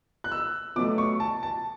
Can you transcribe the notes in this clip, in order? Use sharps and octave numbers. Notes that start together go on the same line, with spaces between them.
F#6
E6
B2 F#3 A3 D6
C#6
A5
A5